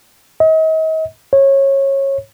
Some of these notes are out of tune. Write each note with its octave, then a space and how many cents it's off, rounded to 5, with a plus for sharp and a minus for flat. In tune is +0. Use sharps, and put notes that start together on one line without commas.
D#5 +40
C#5 -20